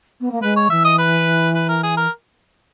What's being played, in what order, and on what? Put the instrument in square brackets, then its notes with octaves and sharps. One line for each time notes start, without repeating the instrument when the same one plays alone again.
[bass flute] B3
A#3
[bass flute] G#3 [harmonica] B4
[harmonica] C#5
[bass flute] E3 [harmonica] E5
[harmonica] D#5
B4
B4
A#4
G#4
A#4